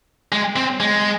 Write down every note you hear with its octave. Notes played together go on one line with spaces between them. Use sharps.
G#3
C4
G#3